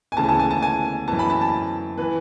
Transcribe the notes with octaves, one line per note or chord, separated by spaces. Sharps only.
G#5
D2 C#3 E3 A5
A5
G#5
A5
G#5
F#2 E3 A5
B5
A5
A5
E3 B4